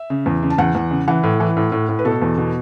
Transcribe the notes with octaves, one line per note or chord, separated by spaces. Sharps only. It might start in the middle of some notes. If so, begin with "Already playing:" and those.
Already playing: E5
C#3
E2
C#3
A5
E2 F#5
E2
C#3
E3 F#5
A2
E3
A2
A2
A2
B4
B2 A4
E2
B2